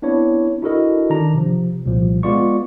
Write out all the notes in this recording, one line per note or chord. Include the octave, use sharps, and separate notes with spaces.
B3 C4 D4 E4 C#5
D4 E4 F#4 A4 A#4 D#5
D#3 D4 A#5
C3 F3
C2 A#2 F3
G#3 B3 F4 D5 C#6